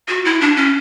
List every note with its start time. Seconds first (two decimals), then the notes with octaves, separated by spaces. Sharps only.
0.08 F#4
0.25 E4
0.41 D4
0.56 C#4